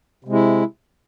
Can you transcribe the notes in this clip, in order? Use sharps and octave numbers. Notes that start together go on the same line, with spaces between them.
C3 G#3 E4